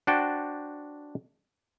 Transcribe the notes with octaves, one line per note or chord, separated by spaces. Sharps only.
D4 F#4 C5 F#5 G5 A5